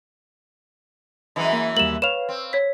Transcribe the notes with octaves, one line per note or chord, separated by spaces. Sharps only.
F#2 E3 G#3 D#5
A#3
D#2 G3 A#3 E7 F#7
B4 C#5 F5 E7 F7
C4
C#5 B6